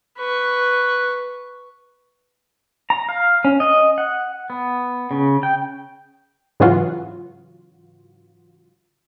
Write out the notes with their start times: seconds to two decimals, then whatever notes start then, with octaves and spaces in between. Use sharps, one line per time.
0.18 B4 C#6
2.90 A#5
3.09 F5
3.45 C#4
3.60 D#5
3.98 F#5
4.50 B3
5.11 C#3
5.43 G5
6.60 G#2 C#3 E3 F#3 F4 F#4